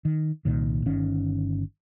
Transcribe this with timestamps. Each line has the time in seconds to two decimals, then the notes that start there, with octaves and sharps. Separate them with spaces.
0.05 D#3
0.45 C2 A#2 D#3
0.86 G1 D#3 C#4